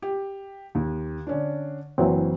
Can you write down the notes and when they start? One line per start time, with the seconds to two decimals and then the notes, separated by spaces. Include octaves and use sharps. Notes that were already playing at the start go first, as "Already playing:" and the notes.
0.02 G4
0.75 D#2
1.27 D3 C#4 D4
1.98 F#1 E3 F#3 C4